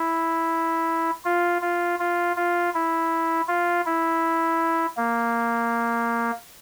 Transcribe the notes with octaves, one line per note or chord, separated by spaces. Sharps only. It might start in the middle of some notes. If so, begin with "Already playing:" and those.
Already playing: E4
F4
F4
F4
F4
E4
F4
E4
A#3